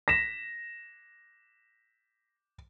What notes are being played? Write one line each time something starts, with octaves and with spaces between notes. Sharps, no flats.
A#6 B6 E7